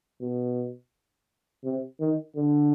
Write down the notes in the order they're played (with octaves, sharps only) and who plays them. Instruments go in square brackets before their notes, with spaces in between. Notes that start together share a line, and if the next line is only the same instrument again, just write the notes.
[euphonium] B2
C3
D#3
D3